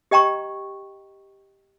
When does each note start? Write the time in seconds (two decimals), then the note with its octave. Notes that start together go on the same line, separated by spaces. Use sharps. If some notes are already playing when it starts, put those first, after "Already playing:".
0.11 G4 D#5 G5 A#5 C#6